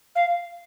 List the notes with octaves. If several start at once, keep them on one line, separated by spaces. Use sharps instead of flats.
F5